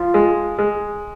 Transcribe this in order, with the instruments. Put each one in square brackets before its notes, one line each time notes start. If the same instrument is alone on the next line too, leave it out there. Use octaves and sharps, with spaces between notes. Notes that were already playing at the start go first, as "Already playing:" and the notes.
Already playing: [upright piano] F3 [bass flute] F4
[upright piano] G#3
G#3